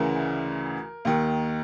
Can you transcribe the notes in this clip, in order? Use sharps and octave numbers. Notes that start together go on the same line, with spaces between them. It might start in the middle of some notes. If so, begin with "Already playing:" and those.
Already playing: D2 C#3 E3 A#4
D#2 D#3